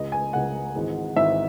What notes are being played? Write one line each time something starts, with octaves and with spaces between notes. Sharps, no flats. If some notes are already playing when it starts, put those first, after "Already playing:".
Already playing: C#2 C#3 G#3 D#5
G#5
C#2 C#3 G#3 F#5
G#1 G#2 E3 G#3
G#1 G#2 E3 G#3 E5